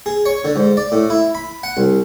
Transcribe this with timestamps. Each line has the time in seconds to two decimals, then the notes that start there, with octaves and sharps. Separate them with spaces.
0.06 G#4
0.26 C#5
0.45 D3
0.56 G#2
0.77 D5
0.92 A2
1.10 E4
1.35 B5
1.63 F#5
1.77 C2